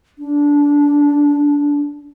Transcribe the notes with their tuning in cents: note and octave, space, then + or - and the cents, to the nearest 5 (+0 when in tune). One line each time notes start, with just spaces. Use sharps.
D4 -20